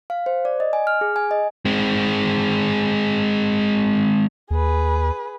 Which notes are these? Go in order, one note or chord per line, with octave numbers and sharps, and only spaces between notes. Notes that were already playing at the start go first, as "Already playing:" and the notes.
F5
C5
D5
D#5
G#5
F6
G#4
G#5
D#5
G#3 C4
D#2 G#4 B4